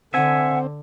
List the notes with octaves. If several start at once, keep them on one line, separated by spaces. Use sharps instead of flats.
D3 C4 E5 F#5 G#5